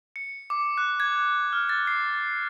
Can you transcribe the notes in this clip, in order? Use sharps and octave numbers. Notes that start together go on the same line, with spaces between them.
C#7
D6
F#6
G#6
F6
A6
C7